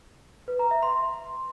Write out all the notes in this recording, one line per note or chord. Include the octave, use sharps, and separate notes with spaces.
B4
A#5
E5
C6